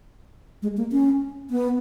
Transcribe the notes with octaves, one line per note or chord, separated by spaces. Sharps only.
G#3
A#3
C#4
B3